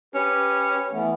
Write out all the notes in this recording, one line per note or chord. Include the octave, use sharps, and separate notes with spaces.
C#4 G4 B4
E3 A3 B3